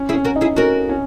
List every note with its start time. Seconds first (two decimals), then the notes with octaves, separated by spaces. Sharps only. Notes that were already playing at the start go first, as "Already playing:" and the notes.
Already playing: C#4
0.09 E4 G#4
0.14 C#4
0.25 F#4 A#4
0.36 D#4
0.41 E4 G#4
0.56 C#4 F#4 A#4
0.89 C#4